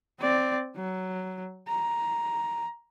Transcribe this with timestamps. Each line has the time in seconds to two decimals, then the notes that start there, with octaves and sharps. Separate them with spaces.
0.20 C4 D5
0.76 F#3
1.68 A#5